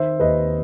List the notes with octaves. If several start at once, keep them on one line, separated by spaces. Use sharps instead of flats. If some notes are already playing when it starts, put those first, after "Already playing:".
Already playing: D#3 C5 E5
D#2 B4 D#5